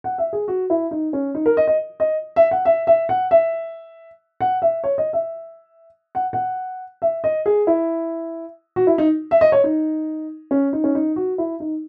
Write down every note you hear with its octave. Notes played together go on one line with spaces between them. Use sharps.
F#5
E5
G#4
F#4
E4
D#4
C#4
D#4
A#4
D#5
D#5
D#5
E5
F#5
E5
E5
F#5
E5
F#5
E5
C#5
D#5
E5
F#5
F#5
E5
D#5
G#4
E4
F#4
E4
D#4
E5
D#5
C#5
D#4
C#4
D#4
C#4
D#4
F#4
E4
D#4